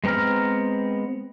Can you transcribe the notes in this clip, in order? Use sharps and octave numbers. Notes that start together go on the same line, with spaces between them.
G#3 B3 C4 A#5 F6